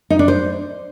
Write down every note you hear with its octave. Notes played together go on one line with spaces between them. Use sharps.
D#4
D4
C5